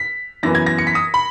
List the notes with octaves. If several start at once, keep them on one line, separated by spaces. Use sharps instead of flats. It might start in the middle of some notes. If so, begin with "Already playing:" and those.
Already playing: B6
F#2 E3 B3 A#6
G#6
A#6
C#7
B6
D#6
B5